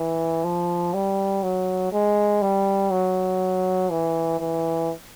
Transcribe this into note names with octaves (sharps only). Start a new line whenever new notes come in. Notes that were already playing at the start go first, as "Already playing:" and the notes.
Already playing: E3
F3
G3
F#3
G#3
G3
F#3
E3
E3